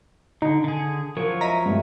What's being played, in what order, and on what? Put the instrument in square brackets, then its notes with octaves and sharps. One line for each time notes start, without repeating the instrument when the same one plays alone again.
[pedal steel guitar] D3 [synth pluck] D#4
[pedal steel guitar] D3 G#4
[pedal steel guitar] F3 F#3 C#5 [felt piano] A#4
[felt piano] D#5 E5 [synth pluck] A#5 B6 D#7
[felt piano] G2 A3